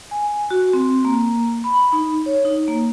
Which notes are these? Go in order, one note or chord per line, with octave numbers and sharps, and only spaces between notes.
G#5
F#4
C4
A#3
B5
D#4
C#5
D#4
A#3